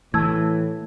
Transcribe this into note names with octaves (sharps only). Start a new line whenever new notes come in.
A2 E3 A3 A5 E6 G#6